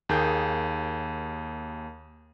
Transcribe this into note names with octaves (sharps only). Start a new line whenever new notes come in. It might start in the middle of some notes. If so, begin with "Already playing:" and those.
D#2 A#3 G#4 G6